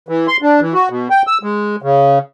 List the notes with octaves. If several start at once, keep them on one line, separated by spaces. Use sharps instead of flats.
E3
C6
D4
E3
F#4
B2
G5
E6
G#3
C#3